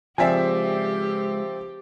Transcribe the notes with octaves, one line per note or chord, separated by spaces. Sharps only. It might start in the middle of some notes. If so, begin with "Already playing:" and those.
C#2 F3 C4 G4 D5 E5 G#5